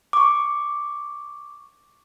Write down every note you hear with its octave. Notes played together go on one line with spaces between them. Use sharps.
C#6 D6